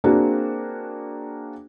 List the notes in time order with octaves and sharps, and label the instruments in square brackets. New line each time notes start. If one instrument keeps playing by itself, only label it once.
[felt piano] A#3 C4 D4 F#4 G#4